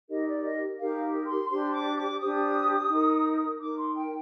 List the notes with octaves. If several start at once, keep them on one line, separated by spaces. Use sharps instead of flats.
D#4 G4 A#4 D#5
D5
D#5
D#4 G4 A#4 F5
C6
D4 G4 C5 C6
D6
D6
D4 G4 C5 D#6
D#4 A#4
D#4 A#4 D6
C6
G5